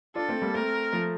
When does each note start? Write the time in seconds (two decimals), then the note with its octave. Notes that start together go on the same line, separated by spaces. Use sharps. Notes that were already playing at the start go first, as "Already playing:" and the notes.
0.15 D4 F4 A4
0.29 A3 C4
0.42 G3 A#3
0.54 A3 C4 A#4
0.93 F3 A3